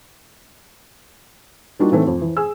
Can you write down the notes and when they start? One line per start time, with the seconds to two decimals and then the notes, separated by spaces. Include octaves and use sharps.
1.79 G3 A#3 D4 D#4 F4 F#4
1.92 A2 D#3 E3 A3 C4
2.07 F2
2.21 E3
2.36 G#4 E6